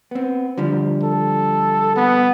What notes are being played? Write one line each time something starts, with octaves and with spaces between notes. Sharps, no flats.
B3 C4
D3 F3 G3
A4
B3